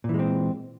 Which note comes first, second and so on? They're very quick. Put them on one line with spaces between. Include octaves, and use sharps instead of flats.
A#2 E3 G#3 C4